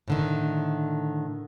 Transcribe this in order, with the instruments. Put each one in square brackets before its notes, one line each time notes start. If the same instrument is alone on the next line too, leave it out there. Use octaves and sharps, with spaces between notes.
[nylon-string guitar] A2 D3 D#3